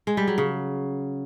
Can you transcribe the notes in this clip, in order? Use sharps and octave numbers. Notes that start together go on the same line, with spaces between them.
G#3
G3
F#3
C#3